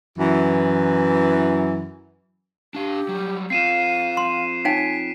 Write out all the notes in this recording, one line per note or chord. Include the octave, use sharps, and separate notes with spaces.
F#2 E3
D4 G4 F5
F#3 G3
C4 F4 F5 C7 D#7 E7
C6
D#4 C#5 G5 G#5 B6 D7